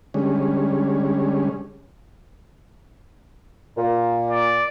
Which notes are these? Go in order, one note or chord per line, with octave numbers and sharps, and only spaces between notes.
D3 G3 G#3 C#4
A#2
D5